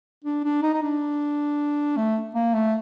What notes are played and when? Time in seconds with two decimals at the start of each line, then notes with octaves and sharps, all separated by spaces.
0.24 D4
0.44 D4
0.62 D#4
0.74 D#4
0.82 D4
1.97 A3
2.35 A#3
2.54 A3